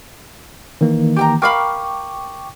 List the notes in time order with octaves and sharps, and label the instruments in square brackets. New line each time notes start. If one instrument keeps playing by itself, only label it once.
[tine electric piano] D#3 E3 A#3
[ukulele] G4 G5 A#5
[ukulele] A#4 F5 B5 [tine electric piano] G5 C#6 D6